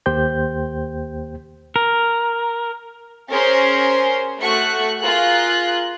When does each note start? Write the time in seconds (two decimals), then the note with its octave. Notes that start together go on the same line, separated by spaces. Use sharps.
0.06 D#2 A#3 G4 C5 G5 G6
1.76 A#4
3.31 C#4 G#4 A#4 C5 C6
4.40 A3 F#4 C#6 F#6
5.01 F4 G#4 A#4 F#6